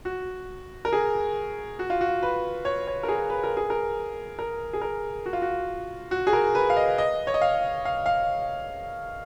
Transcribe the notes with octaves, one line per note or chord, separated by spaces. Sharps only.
F#4
A#4
G#4
F#4
F4
F#4
B4
C#5
C#5
A#4
G#4
B4
A#4
G#4
A#4
A#4
G#4
A#4
F#4
F4
F#4
F#4
G#4
A#4
B4
F5
D#5
D#5
C#5
D#5
F5
F5
F5